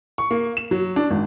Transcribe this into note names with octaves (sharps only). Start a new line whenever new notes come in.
C#6
A#3
E7
F#3
D4
G#1